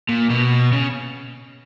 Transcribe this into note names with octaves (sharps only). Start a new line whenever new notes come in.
A#2
B2
C#3